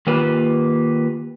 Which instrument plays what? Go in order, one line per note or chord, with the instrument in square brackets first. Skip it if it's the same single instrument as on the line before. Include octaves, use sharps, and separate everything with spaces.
[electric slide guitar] D#3 A#3 F4 G4 B4